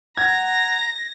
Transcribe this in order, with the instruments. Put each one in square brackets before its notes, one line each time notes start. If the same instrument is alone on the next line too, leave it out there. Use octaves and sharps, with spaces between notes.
[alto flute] F#5 [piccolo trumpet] A#5 [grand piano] G#6 [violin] A#6